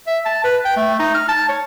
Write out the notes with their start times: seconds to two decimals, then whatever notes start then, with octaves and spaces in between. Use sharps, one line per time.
0.07 E5
0.26 A5
0.44 B4
0.65 G5
0.77 A3
0.99 D#4
1.15 F6
1.29 A5
1.49 C#5